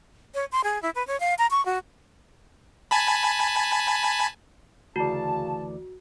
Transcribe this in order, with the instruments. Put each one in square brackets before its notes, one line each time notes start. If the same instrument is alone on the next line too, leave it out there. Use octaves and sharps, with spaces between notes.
[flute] C#5
C6
G#4
E4
B4
C#5
F5
A#5
C#6
F#4
[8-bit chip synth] G#5 A5 B5
[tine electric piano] D2 E3 D5 [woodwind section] C#3 A5 [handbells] F#4